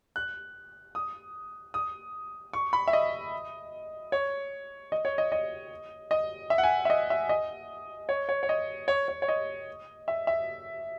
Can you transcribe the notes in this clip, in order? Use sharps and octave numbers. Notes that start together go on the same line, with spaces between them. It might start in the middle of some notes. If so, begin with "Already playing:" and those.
F#6
D#6
D#6
C#6
B5
E5
D#5
C#5
D#5
C#5
D#5
D#5
D#5
E5
F#5
G#5
E5
D#5
E5
D#5
C#5
C#5
C#5
D#5
C#5
C#5
C#5
D#5
E5
E5